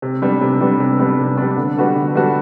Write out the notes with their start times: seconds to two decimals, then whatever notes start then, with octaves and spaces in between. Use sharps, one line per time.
0.02 C3
0.22 G3 B3 D4
0.41 C3
0.61 G3 B3 D4
0.80 C3
0.99 G3 B3 D4
1.19 C3
1.37 G3 B3 D4
1.57 D3
1.77 G3 B3 F#4 A4
1.96 D3
2.15 G3 B3 F#4 A4